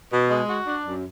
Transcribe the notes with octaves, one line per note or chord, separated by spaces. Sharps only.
B2
G#3
F#4
D4
F#2